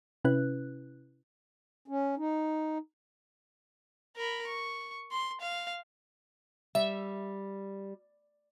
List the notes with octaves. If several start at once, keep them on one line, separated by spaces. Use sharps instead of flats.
C3 C#4 E4 B4 F#6
C#4
D#4
A#4 B5
C#6
C6
F5
G3 E5